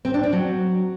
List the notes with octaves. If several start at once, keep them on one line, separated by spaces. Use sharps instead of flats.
C4
D4
C4
F#3